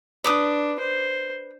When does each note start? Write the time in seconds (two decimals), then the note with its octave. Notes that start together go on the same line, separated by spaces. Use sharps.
0.24 D4 B4 D6 D#6
0.80 C5